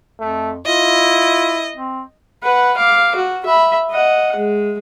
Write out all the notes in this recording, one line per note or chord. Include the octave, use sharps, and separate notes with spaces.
F2 A3
E4 F4 D#5
C4
B4 F#5
F5 D6
F#4
E5 B5
D#5 F#5
G#3